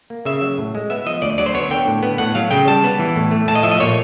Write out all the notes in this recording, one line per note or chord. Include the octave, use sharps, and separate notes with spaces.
A#3
C#3 E5
F#3
A2
G#3
B3 E5
F3 D#5
D2 D5
F#3 D5
C5
B3 C#5
D3 G5
A2
B3
A2 F#5
F#3 F5
C#3 G5
G3 A5
B3
E3
A2
A3
A2 A5
D#5
F3 E5
D#5
A#2 C#5